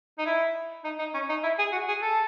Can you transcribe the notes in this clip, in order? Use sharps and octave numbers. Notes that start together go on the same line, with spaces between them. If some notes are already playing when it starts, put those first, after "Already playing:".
D#4
E4
D#4
D#4
C#4
D#4
E4
G#4
F#4
G#4
A4